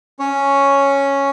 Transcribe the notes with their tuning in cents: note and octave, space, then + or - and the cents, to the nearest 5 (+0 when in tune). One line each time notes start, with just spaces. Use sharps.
C#4 +0 C#5 +0